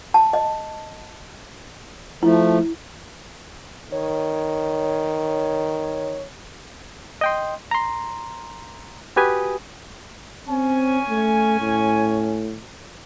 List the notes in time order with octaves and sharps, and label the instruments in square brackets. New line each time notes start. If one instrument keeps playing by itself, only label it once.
[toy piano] A5
D#5
[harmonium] F3 A3 [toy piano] E4
[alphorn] D#3 [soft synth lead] C#5
[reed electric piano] D#5 G5 C6
A#5 C6
F#4 G4 B4 G#5 D#6
[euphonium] C4 [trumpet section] C#4 G#5
[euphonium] A3
A2